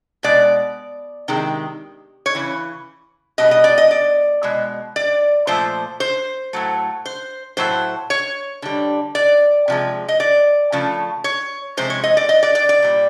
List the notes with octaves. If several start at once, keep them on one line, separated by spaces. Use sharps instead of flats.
B2 G#3 D5
C3 D#3 G#3
C#5
C#3 E3
B2 G3 D#5
D#5
D5
D#5
D5
B2 G#3
D5
A#2 F3 A3 C5
C5
A2 F#3 A3
C5
A2 F#3 A3 C5
C#5
D3 G3
D5
C3 F3 G#3
D#5
D5
C#3 F3 A3
C#5
C3 F3 G#3 C5
C#5
D#5
D5
D#5
D5
D5
D5
A#2 G3